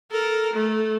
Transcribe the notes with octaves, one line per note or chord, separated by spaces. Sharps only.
A4 A#4
A3